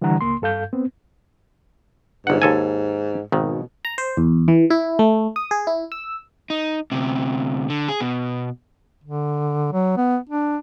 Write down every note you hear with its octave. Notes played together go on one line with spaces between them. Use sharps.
D3 E3 G3 D4 F#5 A#5
C#2 A#3 C6
G2 A4 F5 G6
B3 C4
G1 G#2 F#5
D#2 A4 G#5
G#1 B2 D#3
A#5
C5
E2
E3
E4
A3
D#6
G#4
E4
E6
D#4
D2 C3
D3
G#4
B2
D3
F#3
B3
D4